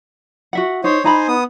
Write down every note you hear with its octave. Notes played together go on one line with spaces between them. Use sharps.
F#4 E5 F#5
D#4 C5 C#5
D#4 C5 G#5 A#5 B5
B3 D#6